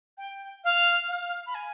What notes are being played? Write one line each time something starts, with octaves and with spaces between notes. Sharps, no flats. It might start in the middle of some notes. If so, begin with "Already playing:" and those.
G5
F5
F5
B5
G#5